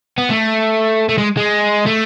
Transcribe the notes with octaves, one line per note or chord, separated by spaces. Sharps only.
B3
A3
A3
G#3
G#3
A3